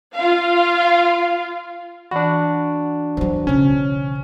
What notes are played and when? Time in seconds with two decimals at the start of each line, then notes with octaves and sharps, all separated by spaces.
0.16 F4 F5
2.11 E3 D4 F#4 D5 B5
3.17 E3 F#3 C5
3.47 B1 C#3 C#4